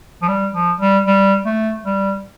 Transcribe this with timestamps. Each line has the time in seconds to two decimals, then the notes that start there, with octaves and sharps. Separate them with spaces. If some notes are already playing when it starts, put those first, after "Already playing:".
0.22 F3
0.28 G3
0.54 F3
0.80 G3
1.06 G3
1.45 A3
1.85 G3